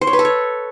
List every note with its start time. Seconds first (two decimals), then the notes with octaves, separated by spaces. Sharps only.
0.01 C5
0.07 C#5
0.13 B4
0.19 A4
0.25 C#5